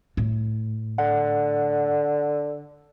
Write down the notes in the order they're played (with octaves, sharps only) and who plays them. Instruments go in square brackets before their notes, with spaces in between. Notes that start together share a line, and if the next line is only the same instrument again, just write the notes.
[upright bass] A2
[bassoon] D3 [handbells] F#5